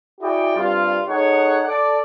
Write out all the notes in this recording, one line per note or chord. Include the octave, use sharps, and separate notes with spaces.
E4 F#4 G#4 D5 D#5 G5
G2 C3 G3 F4
D#4 G#4 A4 C#5 F#5
A4 D5